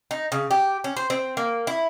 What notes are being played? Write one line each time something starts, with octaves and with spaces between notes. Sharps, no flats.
D#4
C#3
G4
C#4
C5
C4
A#3
E4